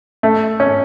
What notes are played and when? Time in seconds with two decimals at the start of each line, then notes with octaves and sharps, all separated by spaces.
0.23 A3
0.60 C#4